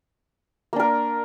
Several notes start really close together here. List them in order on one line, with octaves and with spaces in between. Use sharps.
A#3 D4 A#4